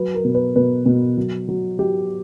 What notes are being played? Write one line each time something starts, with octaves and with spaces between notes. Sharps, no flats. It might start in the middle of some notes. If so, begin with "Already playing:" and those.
Already playing: F#3 B4
A#4
B2
B4
B2 B4
B2
F#3
F#3
F#3 G4